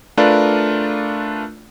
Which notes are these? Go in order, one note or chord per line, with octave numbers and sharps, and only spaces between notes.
A3 D4 F4 A#4 B4 D5